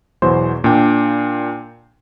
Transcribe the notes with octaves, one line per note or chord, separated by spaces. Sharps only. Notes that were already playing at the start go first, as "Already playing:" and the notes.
E2 B2 E3 F#3 C5 C6
A#2 D4 G5 D6